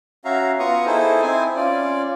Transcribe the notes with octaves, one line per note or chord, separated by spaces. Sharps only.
C#4 F#4 E5 F5 A#5
B3 F4 A#5 C#6 D#6
D#4 E4 G#4 A4 C5
C4 E4 G#5
C#4 F4 D5